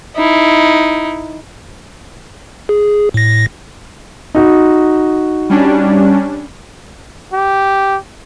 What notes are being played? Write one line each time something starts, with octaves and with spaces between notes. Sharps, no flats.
D#4 E4
G#4
A2 A#6
D#4 F#4
G3 C#4 D4
G4